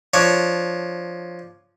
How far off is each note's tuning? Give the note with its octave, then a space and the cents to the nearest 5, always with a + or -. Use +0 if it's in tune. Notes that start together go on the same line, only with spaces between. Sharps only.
F3 +0 D4 +0 C#5 +0